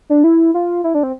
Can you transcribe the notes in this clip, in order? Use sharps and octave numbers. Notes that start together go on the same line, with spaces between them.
D4
E4
F4
E4
D4
C4